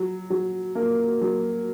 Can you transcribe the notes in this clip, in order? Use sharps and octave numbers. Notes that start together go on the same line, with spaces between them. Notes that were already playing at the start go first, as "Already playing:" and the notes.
Already playing: F#3
F#3
A#3
F#3